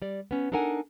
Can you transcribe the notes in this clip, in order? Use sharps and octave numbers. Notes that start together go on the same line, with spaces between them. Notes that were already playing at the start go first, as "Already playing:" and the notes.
G3 D5
B3 C#4
D4 D#4 A4 A#4 F#5 G#5